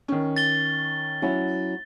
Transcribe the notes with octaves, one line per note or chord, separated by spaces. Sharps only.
D#3 C#4
A6 G7
F#3 C#4 E4